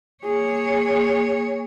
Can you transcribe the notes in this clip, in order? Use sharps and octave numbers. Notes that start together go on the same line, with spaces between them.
A#3 G#4 C#5